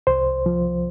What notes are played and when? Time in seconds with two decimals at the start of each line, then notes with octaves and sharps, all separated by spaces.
0.07 C2 C5
0.46 F3